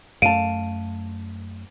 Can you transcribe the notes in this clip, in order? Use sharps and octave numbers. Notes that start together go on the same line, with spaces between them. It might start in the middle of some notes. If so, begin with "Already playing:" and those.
F#2 A3 F5 A5 D7 D#7